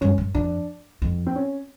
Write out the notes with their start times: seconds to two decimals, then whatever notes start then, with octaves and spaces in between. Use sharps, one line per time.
0.01 G2 C#4
0.18 F#2
0.34 F2 D4
1.02 F2
1.27 C4
1.36 C#4